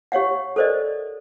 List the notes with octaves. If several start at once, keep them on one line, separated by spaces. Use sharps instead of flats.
G4 C#5 F5 F#5
A4 A#4 C5 D5 D#5